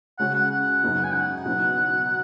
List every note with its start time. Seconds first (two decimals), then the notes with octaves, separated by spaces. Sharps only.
0.19 C#3 G#3 C#4 F#4 F#5
0.34 F#5
0.51 F#5
0.83 F#2 C#3 B3 D#4 F#4
1.04 G#5
1.14 F#5
1.45 B2 F#3 B3 D#4